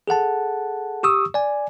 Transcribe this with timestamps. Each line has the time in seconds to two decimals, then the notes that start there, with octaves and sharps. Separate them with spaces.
0.08 G#4 A4 F#5 A5
1.03 G4 C#6 D#6 E6
1.34 D5 G#5